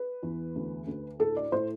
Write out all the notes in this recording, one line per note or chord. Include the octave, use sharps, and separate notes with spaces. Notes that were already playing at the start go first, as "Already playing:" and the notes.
Already playing: B4
E2
D2
D2
A2 A4
D5
A2 C5